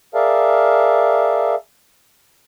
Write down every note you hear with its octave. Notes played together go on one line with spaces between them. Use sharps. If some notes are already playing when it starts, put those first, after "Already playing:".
G#4 A#4 D5 E5 F5 A5